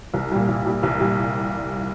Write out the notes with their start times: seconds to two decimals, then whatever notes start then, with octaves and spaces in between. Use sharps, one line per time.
0.14 C2
0.31 A#2 G3
0.48 C2
0.65 A#2 G3
0.83 C2
1.00 A#2 G3